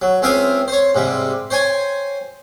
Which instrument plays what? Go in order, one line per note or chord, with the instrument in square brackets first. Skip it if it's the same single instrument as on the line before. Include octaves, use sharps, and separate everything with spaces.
[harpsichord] F#3
C#2 C4 E5 F5 G5 D#6
C5 C#5
G#2 C3 G3
C5 C#5 G5 G#5